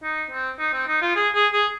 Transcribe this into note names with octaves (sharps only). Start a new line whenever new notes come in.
D#4
C4
D#4
C4
D#4
F4
G#4
G#4
G#4